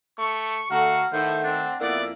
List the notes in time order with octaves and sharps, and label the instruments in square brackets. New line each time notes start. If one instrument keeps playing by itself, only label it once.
[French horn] A3 [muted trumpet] C#6
[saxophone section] D3 A3 [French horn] F#4 [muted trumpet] F5 [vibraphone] F#5 A#5
[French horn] A2 [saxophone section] D#3 A3 [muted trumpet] C5 [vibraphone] F#5
[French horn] C4 [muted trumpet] D4
[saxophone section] F2 A#3 E4 [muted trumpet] B3 [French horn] D5